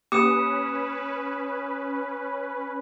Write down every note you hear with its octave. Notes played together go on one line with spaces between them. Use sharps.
A#3 C#4 G4 B4 D6 D#6 C#7 E7